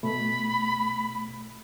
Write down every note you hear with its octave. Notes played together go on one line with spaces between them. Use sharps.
B2 A3 B5